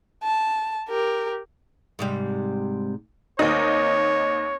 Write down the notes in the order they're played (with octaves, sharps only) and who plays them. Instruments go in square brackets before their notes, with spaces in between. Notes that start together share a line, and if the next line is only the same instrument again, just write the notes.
[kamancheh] A5
G4 A#4
[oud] G#2 C3 G3
[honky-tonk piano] D#2 D#4 [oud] C4 [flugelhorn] C#5